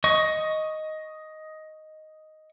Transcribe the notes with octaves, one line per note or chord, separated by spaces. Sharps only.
D#5 C#6